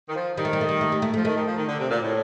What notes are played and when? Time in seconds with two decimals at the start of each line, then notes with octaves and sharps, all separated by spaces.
0.09 D#3
0.16 F3
0.37 D#3 G3
0.45 A3
0.53 G3
0.61 A3
0.69 G3
0.81 A3
0.92 G3
1.02 A3
1.14 A3
1.17 F3
1.25 D#3 A3
1.35 D#3
1.47 F3
1.57 D#3
1.68 D3
1.79 C3
1.90 A#2
2.01 A2